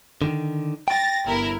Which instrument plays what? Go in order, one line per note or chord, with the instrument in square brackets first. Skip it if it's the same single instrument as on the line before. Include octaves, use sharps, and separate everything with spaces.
[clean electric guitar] D3 D#3
[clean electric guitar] G5 [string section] A6 A#6
[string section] G1 E4 A#4